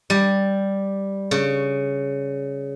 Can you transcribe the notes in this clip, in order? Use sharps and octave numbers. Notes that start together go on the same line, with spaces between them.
G3
C#3